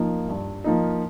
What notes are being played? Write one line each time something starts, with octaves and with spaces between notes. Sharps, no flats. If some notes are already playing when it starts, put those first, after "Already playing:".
Already playing: F3 A#3 D#4
G2
F3 A#3 D#4